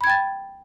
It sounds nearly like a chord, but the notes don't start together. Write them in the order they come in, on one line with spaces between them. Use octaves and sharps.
B5 G#6 G5 A6